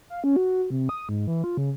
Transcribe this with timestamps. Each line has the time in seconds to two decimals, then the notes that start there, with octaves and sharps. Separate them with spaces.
0.10 F5
0.24 C#4
0.36 F#4
0.70 C3
0.89 D#6
1.09 G#2
1.27 E3
1.44 F4
1.57 C#3